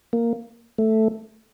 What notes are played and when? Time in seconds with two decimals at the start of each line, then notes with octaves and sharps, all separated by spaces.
0.13 A#3
0.78 A3